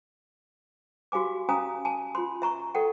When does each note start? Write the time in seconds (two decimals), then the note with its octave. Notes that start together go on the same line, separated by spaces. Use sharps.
1.12 F#4 G4 F5 G#5 D6
1.49 C#4 F5 G#5 A#5 D#6
1.85 G#5 A5
2.15 F4 C6
2.42 E5 A#5 C#6
2.75 A4 D#5 F#5 G5